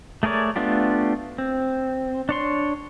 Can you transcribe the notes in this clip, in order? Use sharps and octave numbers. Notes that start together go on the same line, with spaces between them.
A3 G#4 A#4 C#5 D5
A3 B3 D4 F4 G4
C4
D4 C#5 C6